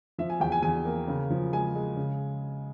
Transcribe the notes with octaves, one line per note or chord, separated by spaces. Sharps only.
F3 E5
G#5
E2 G5
G#5
E2 G#5
A#3
C#3
F3
G#3 G#5
G#3
C#3